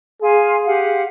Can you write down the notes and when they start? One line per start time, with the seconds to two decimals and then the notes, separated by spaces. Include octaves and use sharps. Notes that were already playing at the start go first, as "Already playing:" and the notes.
0.22 G#4 F5 G#5 C6
0.66 G4 F5 F#5